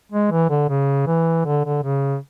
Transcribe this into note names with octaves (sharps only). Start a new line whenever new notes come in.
G#3
E3
D3
C#3
E3
D3
D3
C#3